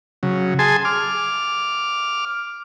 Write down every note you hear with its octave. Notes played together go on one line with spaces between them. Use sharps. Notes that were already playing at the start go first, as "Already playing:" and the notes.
C#3 F#3
G#4 G#5 A5 C6
D6 F6